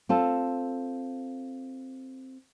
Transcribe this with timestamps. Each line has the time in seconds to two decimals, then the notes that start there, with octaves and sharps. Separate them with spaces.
0.09 C4 F4 A4